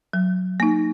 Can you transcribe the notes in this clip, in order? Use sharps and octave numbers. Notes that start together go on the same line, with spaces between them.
F#3
A#3 D#4